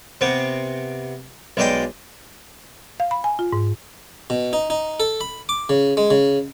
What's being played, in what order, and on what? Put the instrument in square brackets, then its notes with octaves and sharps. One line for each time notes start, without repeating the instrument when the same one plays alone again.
[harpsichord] C3 B3 C4
B1 G#3 D5 D#5 G5
[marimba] F5
B5
G#5
F4
G#2
[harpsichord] B2
D#4
D#4
A4
B5
D6
C#3
G#3
C#3